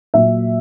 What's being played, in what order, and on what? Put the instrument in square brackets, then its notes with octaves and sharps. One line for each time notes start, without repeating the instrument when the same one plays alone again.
[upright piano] A#2 F#3 E5